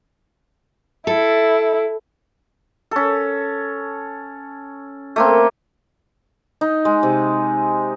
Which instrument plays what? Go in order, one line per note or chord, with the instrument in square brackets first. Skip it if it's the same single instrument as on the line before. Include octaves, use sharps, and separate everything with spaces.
[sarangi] E4 [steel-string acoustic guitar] A4
[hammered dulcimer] C#4 A4
A3 A#3 C4
D#4
G#3
C3